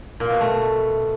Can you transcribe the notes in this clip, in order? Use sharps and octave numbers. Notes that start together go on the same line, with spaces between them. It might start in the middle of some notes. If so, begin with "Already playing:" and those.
A#2
B2
A3
B2